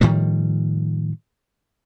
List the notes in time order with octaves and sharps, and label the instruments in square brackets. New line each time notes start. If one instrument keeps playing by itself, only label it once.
[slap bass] A2 D#3 F3 G3